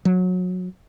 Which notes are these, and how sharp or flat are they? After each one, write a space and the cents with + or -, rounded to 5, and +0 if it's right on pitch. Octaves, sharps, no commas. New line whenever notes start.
F#3 -20